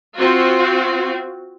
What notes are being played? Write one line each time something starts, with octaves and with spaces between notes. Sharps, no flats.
C4 F4 F#4